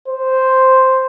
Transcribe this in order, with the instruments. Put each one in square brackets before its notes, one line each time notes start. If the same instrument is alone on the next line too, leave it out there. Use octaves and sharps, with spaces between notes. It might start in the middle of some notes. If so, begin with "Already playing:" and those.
[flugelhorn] C5